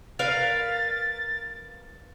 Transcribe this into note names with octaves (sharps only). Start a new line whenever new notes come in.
A#4 B4 F5 A6